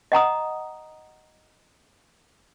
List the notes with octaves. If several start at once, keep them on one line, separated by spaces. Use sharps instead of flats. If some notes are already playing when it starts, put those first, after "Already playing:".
D#5 F#5 A#5 D#6